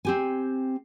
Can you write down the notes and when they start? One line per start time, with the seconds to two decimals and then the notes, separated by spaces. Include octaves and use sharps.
0.05 C4 G4 G#5